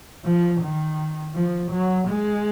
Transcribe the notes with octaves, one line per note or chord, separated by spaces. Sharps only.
F3
D#3
F3
F#3
G#3